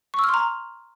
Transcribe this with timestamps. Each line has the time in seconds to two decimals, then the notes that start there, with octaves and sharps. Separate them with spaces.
0.14 C#6
0.19 E6
0.24 F6
0.29 C6
0.34 A#5